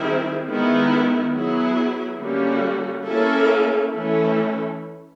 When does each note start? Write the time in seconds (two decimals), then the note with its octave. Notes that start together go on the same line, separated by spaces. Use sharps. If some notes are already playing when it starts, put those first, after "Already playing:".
Already playing: D#3 G3 C4 E4 G#4
0.48 D#3 G#3 B3 E4
1.34 F#3 B3 E4 G#4
2.19 D3 G3 A#3 C#4 F#4
3.04 A#3 C#4 E4 A4
3.90 E3 A3 C#4 E4 A4